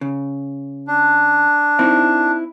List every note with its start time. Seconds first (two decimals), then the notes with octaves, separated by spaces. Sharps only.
0.01 C#3
0.87 D4
1.79 C4 D#4 E4